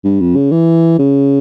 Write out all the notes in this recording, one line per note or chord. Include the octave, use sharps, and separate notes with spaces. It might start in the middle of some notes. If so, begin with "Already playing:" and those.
G2
F2
C#3
E3
C#3